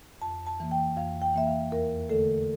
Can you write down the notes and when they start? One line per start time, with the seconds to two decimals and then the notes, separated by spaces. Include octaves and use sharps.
0.22 F2 A5
0.47 A5
0.60 E3 A#3
0.71 G5
0.96 F2 F5
1.22 G5
1.34 E3 A#3 E5
1.47 F5
1.72 E2 A#4
2.09 D3 A3 A4